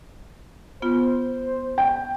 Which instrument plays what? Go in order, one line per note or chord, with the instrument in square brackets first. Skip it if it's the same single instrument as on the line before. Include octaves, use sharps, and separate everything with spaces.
[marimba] B3 F4 [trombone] C5
[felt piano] G5